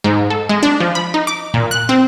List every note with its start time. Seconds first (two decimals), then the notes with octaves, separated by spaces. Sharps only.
0.04 G#2
0.30 A4
0.49 G#3
0.63 D4
0.80 F3
0.95 B5
1.14 D#4
1.27 D6
1.54 A#2
1.71 F#6
1.89 C4